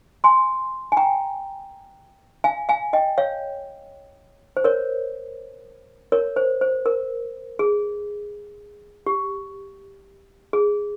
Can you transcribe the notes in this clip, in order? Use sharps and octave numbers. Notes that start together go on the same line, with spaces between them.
G#5 C6
G#5
G5 A#5
F5 G#5
F5 G#5
D#5 G5
C#5 F5
C5
A#4 C#5
A#4 C#5
C5
C5
A#4
G#4
G4
G#4